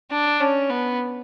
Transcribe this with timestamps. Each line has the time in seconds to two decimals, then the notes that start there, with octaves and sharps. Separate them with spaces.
0.12 D4
0.40 C#4
0.69 B3